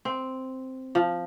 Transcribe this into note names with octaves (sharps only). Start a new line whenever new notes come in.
C4
F3